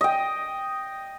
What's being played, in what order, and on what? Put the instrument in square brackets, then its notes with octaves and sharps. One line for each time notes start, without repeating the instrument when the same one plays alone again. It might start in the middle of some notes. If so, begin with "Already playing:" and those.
[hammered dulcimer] D#5 G5